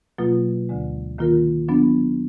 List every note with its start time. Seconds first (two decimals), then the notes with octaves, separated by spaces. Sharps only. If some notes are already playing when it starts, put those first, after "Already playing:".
0.18 B2 F#3 A#3 F4 B4
0.69 D2 D3 G#3
1.18 D#3 A#3 F4 A#4
1.68 F#3 B3 D4